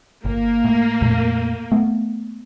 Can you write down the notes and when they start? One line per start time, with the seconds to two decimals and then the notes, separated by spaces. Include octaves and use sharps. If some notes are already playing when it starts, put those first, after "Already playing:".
0.25 G1 A#3
0.65 A2
1.02 F2 A#2 A3
1.72 A3 B3